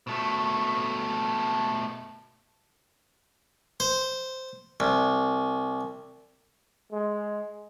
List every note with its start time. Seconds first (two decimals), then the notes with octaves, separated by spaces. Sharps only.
0.07 B2 A3
3.80 C5
4.80 C2
6.92 G#3